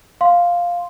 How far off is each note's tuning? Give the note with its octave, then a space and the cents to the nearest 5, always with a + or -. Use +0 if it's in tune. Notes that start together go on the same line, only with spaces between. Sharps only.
F5 +0 C6 +0